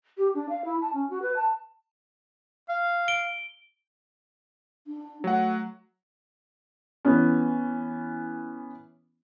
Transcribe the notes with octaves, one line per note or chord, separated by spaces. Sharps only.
G4
D4
F5
E4
A5
C#4
F#4
B4
A5
F5
D7 G7
D4
F#3 A3 F#5
E3 B3 C#4